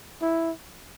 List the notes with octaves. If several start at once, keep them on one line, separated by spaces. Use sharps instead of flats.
E4